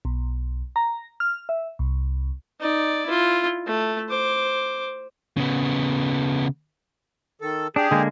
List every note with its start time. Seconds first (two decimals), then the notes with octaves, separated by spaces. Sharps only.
0.05 B1
0.76 A#5
1.20 F6
1.49 E5
1.79 C2
2.60 D#4 D5
3.06 E4 F4
3.66 A3
4.09 C5 D6
5.37 C#3 B3
7.41 D#3 A4
7.76 D4 G4 G#4
7.91 D3 G#3 A#3